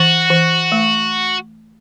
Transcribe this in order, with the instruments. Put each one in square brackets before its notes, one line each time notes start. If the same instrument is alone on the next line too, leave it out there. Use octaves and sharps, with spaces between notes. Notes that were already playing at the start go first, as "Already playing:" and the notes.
Already playing: [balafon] E3 [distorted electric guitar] F#4
[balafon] E3
A3